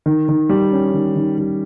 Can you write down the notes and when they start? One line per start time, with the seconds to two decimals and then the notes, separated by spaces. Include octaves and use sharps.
0.06 D#3
0.29 D#3
0.49 G3
0.72 C#4
0.93 D#3
1.16 D#3
1.38 G3